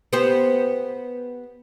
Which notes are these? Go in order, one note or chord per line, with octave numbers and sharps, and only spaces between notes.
B3 G4 C5